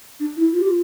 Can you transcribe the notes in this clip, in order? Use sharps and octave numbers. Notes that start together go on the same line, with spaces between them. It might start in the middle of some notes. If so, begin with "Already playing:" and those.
D4
E4
F4
G4
F4